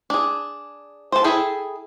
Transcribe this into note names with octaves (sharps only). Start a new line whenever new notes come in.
D4 G#4
C5 A5
E4 G#4 A4 G5